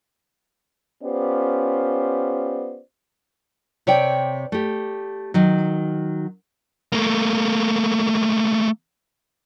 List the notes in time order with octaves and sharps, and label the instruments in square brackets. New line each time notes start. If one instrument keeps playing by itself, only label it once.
[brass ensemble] B3 C#4 F4 G4 C5 D5
[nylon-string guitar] C3 C#5 D5 G5
A3 G4
D#3 F#3
[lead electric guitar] A3 A#3